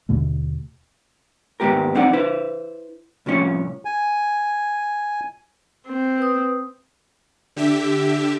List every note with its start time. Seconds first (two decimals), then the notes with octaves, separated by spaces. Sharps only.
0.09 D#2 B2 D3 A3
1.60 D#2 G#2 G#3 B3 G4 A#4
1.95 F#3 C4 D#4 D5 F#5
2.13 E4 B4 C5
3.26 C2 A2 F3 C#4 C#5
3.85 G#5
5.87 C4
6.18 B4 D#6
7.56 D3 G4 E5